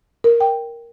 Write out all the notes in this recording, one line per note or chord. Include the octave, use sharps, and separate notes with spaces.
A#4
G5